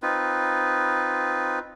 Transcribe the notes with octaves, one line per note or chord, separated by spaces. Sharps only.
C4 D#4 F4 B4